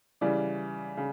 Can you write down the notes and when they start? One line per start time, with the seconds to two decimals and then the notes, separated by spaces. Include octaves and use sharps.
0.21 C#3 E3 G3 D5
0.97 C#3